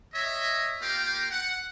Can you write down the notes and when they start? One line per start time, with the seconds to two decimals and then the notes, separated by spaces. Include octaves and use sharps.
0.14 C#5 D#5 E5
0.81 A#3 F4 G4 A#4 F5 G5
1.30 F#5